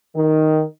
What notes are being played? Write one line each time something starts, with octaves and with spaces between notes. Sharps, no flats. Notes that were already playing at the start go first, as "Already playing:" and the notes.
D#3